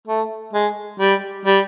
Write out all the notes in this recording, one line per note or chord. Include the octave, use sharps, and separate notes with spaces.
A3
G#3
G3
G3